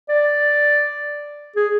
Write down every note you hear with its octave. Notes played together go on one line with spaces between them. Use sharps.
D5
G#4